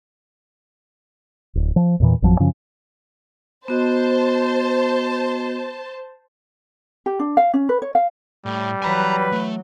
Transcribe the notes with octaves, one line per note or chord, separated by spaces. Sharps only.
D1
F3
E2 A#2 E3
G#1 F2 F3 F#3
F#2 C#3 F3 C#4
B3 F#4 C5 D#5 A5
G4
D4
F5
C#4
B4
C#5
F5
A2 G3
E3 F#3 B4 G#5 A#5
A3